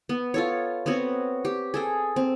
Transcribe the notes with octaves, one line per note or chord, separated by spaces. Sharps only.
B3
F4 A4 C#5
B3 C4 F#4 C#5
G4
G#4 A4 G5
C4